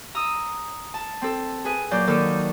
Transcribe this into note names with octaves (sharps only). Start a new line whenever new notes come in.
A#5 D#6 E6
A5
C4 A4
G#4 B4 G#5
A#2 F#3 D5 G6
D#2 D#3 A4 D5